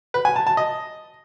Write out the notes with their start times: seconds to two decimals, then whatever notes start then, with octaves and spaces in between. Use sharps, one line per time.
0.14 B4
0.25 G#5
0.36 A5
0.47 A5
0.57 D#5